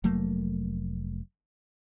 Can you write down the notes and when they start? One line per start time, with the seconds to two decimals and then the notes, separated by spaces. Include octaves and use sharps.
0.04 F1 F#3 A3 A#3